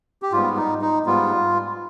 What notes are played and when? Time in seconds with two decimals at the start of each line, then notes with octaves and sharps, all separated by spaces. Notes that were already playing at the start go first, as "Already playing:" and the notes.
0.22 G4
0.32 G#2 G3 B3 F4
0.57 D#4
0.82 D#4
1.06 G#2 G3 B3 F4